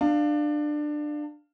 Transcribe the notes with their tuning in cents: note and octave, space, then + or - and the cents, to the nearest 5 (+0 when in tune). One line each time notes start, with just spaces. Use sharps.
D4 +20 F5 +0